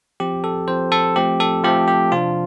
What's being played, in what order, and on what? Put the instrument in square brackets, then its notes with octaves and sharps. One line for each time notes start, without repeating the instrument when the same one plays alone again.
[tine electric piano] F3 C4 G4
A4
F3 C4 C5
A4
F3 A3 C4 G4
A4
F3 A3 C4 G4
G4
C3 F3 D4 F4